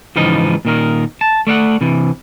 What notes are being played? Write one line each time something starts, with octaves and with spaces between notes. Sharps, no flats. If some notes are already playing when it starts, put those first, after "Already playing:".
C#2 G#2 E3 F3 D#4 D#5
A#2 D#3 A#4
A5
A3 D5 F5 F#5
C3 E3